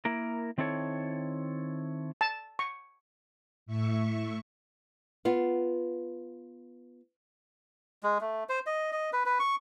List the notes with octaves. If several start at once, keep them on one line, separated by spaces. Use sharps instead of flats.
A#3 E4 A#4
D#3 C4 E4 A4 C#5
A5
C#6
A2 E5 C#6
B3 F4
G#3
A3
C5
D#5
D#5
B4
B4
C#6